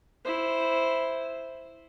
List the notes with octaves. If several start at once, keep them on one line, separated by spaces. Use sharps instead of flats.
E4 C5